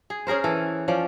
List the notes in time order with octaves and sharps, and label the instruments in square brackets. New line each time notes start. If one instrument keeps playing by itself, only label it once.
[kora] G#4
C#4 G#4 A#4 C5
E3 A4
F3 C#4 D5